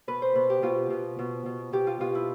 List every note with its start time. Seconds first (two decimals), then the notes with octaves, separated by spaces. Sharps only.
0.08 B2 B4
0.22 C5
0.35 B2 B4
0.50 G4
0.62 B2 F4
0.90 B2
1.19 B2
1.46 B2
1.72 B2 G4
1.87 F4
2.00 B2 F4
2.15 E4